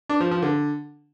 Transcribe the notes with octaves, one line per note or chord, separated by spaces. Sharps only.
D4
F3
F3
D3